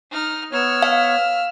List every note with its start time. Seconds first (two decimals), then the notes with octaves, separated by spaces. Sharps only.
0.11 D#4 F6
0.53 B3 C#5 E6 F6
0.82 F5